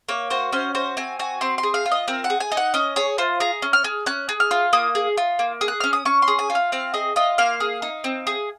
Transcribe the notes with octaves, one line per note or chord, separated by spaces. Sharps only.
A#3 C#5
F#4 C5
C#4 C5
F#4 C5
C4 G#5
F#4 G#5
C4 C6
C6
G#4
F5
F4
D#5
C4 A#4
F#5
G#4
G#5
D#4
F#5
C#4 D#5
G#4 C#5
F4 C5
G#4 A#5
C#4
F6
G#4
C#4 F#6
G#4
F6
F4
A#3 D#6
G#4
F4
A#3
G#4
F#6
C#4 F6
D#6
C#4 C#6
C6
G#4
G#5
F4
F5
C4 F5
G#4 D#5
F4 D#5
A#3 F5
G#4
D#4
C4
G#4